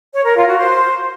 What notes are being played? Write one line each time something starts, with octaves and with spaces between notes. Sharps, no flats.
C#5
A#4
F4
F#4
C5